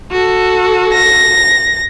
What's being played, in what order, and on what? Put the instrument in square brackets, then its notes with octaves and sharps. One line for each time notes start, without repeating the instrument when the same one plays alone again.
[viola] F#4 A4
[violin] A#6